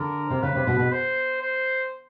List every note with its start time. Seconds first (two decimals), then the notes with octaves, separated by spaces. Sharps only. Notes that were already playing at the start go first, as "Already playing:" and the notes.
Already playing: D3 A#4
0.30 C3
0.43 C#3 B4
0.55 C3
0.67 B2
0.79 B2
0.92 C5
1.42 C5